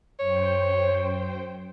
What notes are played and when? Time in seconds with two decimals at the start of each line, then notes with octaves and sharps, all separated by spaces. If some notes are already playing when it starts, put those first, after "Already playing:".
0.20 F#2 C5 C#5 G5